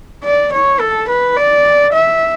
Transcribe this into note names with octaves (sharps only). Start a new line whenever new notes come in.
D5
C#5
A4
B4
D5
E5